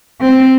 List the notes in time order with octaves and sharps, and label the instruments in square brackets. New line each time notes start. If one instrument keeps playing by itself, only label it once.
[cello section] C4